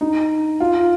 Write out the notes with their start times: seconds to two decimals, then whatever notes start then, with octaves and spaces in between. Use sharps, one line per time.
0.01 D#4
0.60 F4